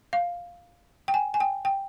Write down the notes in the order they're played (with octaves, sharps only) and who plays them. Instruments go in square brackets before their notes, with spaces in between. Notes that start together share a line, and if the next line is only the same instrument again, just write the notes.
[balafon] F5
G5
G#5
G#5
G5
G5